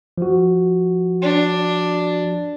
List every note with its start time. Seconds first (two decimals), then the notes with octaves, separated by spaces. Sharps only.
0.18 F3 F#4
1.22 D4